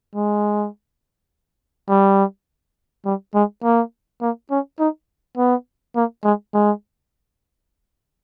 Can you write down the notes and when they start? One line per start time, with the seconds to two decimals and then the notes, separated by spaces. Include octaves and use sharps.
0.15 G#3
1.89 G3
3.05 G3
3.34 G#3
3.64 A#3
4.22 A#3
4.50 C#4
4.80 D#4
5.37 B3
5.96 A#3
6.24 G#3
6.54 G#3